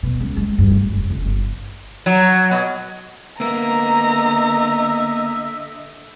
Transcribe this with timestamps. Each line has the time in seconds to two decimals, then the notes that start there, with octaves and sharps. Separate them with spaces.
0.03 B2
0.20 C#2
0.37 G#3
0.58 G2
0.71 D1
0.92 F1
1.10 C#3
1.26 G1
2.06 F#3
2.51 B2
3.40 D3 A#3 B3 A#4 D#5 E5 A#5